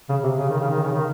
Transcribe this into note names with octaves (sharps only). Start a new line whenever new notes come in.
C#3
C3
C#3
D#3
C#3
D#3
C#3
D#3